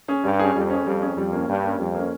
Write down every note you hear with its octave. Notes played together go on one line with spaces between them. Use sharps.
C#4 G#4
G2 G3
C#4 G#4
F2 G3
C#4 G#4
F2 G3
C#4 G#4
F2 G3
A#3 C#4
G2 G3
A#3 C#4
F2 G3
A#3 C#4